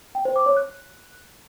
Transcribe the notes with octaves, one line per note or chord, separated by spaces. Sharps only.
G5
C5
D6
C#5
F#6